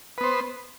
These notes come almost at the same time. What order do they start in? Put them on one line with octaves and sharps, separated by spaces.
B4 B3 C5